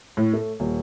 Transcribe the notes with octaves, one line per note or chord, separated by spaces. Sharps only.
A2
A3
D#1